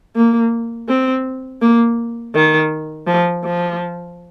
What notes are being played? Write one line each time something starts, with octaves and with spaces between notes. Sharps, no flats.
A#3
C4
A#3
D#3
F3
F3